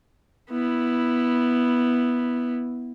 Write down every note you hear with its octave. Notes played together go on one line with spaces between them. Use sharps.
B3 E4